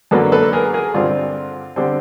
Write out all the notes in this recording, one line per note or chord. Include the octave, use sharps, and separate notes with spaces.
F#2 D3 F#3 A#3 A4 B4
A4 B4
G#4 A#4
G#4 A#4
G2 D3 G3 C4 F4
D3 G3 C4